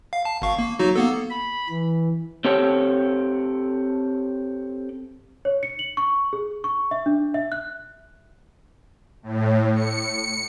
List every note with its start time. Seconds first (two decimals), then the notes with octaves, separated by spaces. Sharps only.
0.13 F5
0.25 A5
0.42 G#1 F5 C#6
0.59 A#3
0.79 F#3 D#4 F#4
0.96 A#3 B3 A4
1.30 B5
1.69 E3
2.45 C4 G4 A4 C#5
5.45 C#5
5.63 C#7
5.79 F#7
5.97 C#6
6.33 G#4
6.64 C#6
6.91 E5
7.06 D4
7.34 E5
7.52 F#6
9.23 A2
9.75 C#7